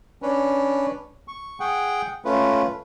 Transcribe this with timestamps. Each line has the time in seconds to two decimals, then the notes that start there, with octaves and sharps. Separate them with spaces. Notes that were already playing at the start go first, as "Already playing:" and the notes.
0.22 C#4 D4 B4
1.28 C#6
1.60 G#4 F#5 G5
2.25 A3 C#4 F4 B4